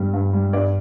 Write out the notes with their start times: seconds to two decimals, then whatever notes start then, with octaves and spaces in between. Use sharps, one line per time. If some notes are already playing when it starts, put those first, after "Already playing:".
Already playing: G2 G3
0.13 G2
0.33 G3
0.53 G2 D5